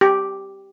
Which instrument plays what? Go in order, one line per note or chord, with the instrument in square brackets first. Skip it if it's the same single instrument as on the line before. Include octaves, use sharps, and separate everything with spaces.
[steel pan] G4